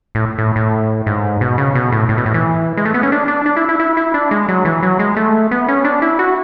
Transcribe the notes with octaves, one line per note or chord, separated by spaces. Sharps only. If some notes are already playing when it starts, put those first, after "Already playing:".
A2
A2
A2
G#2
B2
C#3
B2
A2
A2
B2
A2
E3
G#3
A3
B3
C#4
D4
D4
D4
E4
E4
E4
E4
D4
G#3
F#3
E3
F#3
G#3
A3
B3
C#4
D4
E4
F#4